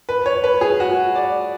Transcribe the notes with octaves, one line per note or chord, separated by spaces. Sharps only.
B4
C#5
B4
G#4
F#4
D5